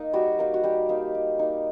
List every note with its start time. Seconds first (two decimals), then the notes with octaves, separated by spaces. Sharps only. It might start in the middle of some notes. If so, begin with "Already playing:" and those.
Already playing: A#3 D#4
0.13 G3 F#4
0.39 A#3 D#4
0.54 F#4
0.64 G3 G4
0.89 A#3 D#4
1.15 G3
1.39 A#3 D#4